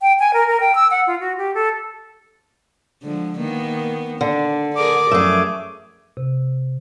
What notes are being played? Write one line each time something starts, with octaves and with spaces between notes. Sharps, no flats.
G5
G#5
A#4
A#4
G5
E6
F#5
F4
F#4
G4
A4
D3 F3 G#3
D#3 A#3 B3
D3 D4
G#4 A#4 D5 D6
F#2 F3 A3 G#4
C3